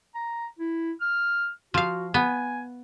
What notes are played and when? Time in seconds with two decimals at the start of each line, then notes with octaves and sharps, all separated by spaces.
0.15 A#5
0.59 E4
1.01 F6
1.74 F3 F#4 F5
2.14 B3 G#5